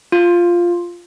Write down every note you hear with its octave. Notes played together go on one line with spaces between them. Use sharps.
F4